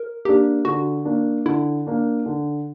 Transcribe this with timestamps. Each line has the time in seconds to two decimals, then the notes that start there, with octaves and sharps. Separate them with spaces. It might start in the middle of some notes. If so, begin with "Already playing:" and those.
Already playing: A#4
0.25 A#3 D4 G4
0.65 D3 F#4
1.05 A#3 D4
1.45 D3 E4
1.87 A#3 D4
2.26 D3